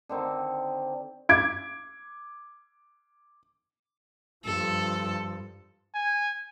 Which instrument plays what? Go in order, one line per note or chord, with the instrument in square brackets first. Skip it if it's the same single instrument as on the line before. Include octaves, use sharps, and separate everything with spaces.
[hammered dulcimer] D3 D#3 C4
[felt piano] D6 G#6 D7
[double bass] G2 F3 [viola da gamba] A4
[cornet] G#5